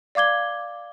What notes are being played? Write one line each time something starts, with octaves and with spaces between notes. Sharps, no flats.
D5 F5 D6 G#6 G7